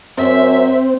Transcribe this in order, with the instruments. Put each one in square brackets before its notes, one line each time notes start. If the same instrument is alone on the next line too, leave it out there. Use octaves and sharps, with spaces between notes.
[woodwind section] F#2 [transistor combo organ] C4 [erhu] E5